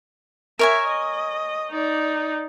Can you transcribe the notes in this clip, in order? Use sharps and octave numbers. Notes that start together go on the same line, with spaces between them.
A#4 C#5 E5 G#5
D#5
D#4 D5